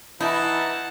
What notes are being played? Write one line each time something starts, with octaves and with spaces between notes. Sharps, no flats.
E3 D#4 E4 F#5 A5